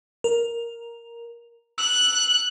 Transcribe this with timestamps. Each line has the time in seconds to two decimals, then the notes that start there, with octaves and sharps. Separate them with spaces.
0.24 A#4
1.78 E6 F#6